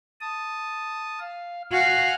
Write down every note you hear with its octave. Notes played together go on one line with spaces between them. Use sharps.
A5 D#6
F5
F#4 F5 G#5 F6 F#6